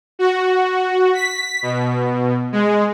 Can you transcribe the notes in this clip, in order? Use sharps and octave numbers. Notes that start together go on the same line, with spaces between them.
F#4
B6
B2
G#3